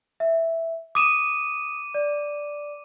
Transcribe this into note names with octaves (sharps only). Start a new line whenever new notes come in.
E5
D6 D#6 D#7 E7
D5